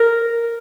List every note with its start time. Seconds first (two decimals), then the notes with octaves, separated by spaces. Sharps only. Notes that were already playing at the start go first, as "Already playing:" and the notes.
Already playing: A#4